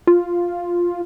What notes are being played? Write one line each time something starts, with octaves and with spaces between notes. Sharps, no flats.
F4